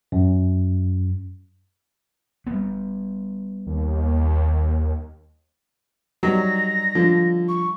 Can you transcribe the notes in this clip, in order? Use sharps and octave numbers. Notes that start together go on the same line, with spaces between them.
F#2
G3 B3
D#2
F#3 G3 D#4 A#6
D3 F3
C#6